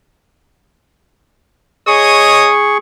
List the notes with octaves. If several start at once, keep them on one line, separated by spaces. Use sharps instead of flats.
G#4 C#5 D#5 C#6 D#6